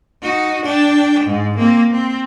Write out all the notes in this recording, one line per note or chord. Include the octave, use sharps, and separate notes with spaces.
D#4 F#4
D4 G5
G#2
A#3 C4
C4